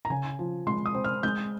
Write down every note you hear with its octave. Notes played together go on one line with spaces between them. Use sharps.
A#5
C#3 G#5
F3
G#3 C6
D#6
C4
F6
G#3 G6